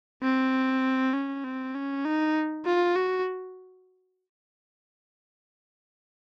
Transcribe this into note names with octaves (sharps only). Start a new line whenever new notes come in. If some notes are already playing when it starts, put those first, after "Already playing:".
C4
C#4
C4
C#4
D#4
F4
F#4